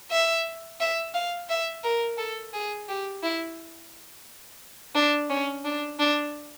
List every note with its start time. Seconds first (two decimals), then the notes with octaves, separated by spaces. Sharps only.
0.11 E5
0.80 E5
1.14 F5
1.49 E5
1.83 A#4
2.18 A4
2.53 G#4
2.88 G4
3.23 E4
4.95 D4
5.29 C#4
5.65 D4
5.99 D4